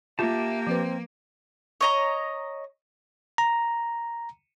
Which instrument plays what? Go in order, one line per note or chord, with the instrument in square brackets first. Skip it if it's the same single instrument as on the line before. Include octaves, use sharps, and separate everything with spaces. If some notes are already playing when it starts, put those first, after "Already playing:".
[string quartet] A#3 [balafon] F4 [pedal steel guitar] G4 A5 [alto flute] E5
[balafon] F3 B4 [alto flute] C4
[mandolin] C#5 D#5 A#5
[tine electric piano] A#5